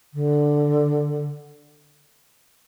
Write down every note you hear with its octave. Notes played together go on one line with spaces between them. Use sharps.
D3